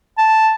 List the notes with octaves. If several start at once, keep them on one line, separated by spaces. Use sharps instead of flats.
A5